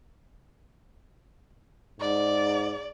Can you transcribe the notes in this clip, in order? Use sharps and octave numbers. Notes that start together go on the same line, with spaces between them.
G#2 D5